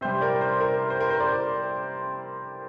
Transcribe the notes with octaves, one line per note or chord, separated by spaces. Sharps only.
C3 G3 C5
A#4 D5
C5
A#4
C5
A#4
C5
A#4 D5